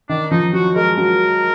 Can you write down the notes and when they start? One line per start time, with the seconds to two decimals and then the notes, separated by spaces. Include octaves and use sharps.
0.09 D#3 D4
0.31 F3 D#4
0.53 F#3 F#4
0.75 G#3 A#4
0.97 F#3 A#4